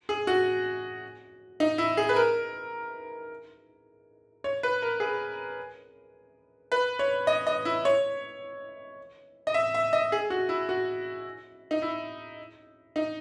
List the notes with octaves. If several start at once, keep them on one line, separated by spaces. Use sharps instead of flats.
G#4
F#4
D#4
E4
G#4
B4
A#4
C#5
B4
A#4
G#4
B4
C#5
D#5
D#5
E4
C#5
D#5
E5
E5
D#5
G#4
F#4
E4
F#4
D#4
E4
D#4